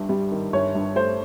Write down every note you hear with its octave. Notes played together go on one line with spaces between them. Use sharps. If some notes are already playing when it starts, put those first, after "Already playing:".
Already playing: G1 G2
G3
D#3
G1 C#5
G2
A3 C5